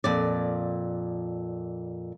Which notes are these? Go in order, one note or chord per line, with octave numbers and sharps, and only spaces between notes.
F2 A#2 D5